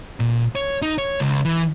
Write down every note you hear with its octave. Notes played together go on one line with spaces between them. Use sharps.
A#2
C#5
D#4
C#5
C#2
E3